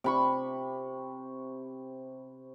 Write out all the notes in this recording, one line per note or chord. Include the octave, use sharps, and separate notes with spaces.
C3 B5 C#6